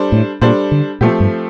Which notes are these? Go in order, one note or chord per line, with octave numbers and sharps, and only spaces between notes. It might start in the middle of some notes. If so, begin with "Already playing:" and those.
Already playing: G3 D4 A4 C5
A2
A#2 G3 D4 A4 C5
D3
A#2 F3 A3 C4 G4
G2